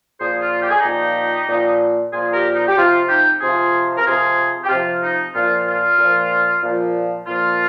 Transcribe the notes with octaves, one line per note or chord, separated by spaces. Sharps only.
A#2 F3 G#4 C5
F4
G4
G#4
D#4 G4
A#2 F3
A#2 F3
A#2 F3 F4 G#4
G4 A#4
D#4
G4
C3 F3 F4
D#4 G4
C3 F3 F4 G#4
A#4
C3 F3 F4 G#4
G4
C3 F3 F4
D#4
A#2 F3 F4
F4
A#2 F3
A#2 F3
A#2 F3 F4